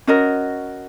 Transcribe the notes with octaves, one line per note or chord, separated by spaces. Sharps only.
C#4 F#4 A#4 D#5